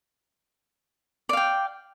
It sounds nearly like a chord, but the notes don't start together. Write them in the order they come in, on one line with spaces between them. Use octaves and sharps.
D5 F5 G5